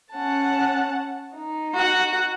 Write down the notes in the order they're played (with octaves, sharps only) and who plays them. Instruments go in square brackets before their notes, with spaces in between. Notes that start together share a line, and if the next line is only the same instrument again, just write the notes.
[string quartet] C#4 F#5 A5
D#4
[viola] F#4 F#5